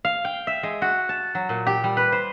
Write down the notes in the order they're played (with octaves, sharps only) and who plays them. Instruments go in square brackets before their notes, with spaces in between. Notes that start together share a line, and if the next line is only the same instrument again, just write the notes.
[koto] F5
G5
E5
G#3
F#4
A5
F#3
A#2
G4
G3
B4
C5